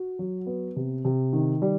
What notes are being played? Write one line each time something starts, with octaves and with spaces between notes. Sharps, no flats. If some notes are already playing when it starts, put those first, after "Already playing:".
Already playing: F#4
F#3
B3
C3
C3
D#3
G3